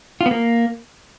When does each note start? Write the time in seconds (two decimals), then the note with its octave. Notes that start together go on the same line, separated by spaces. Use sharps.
0.21 F4
0.26 B3
0.31 A#3